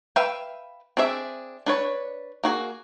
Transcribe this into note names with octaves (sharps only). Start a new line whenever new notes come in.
B4 E5 F5 G5
C4 D4 G#4 E5
D4 B4 C#5
A#3 F#4 G#4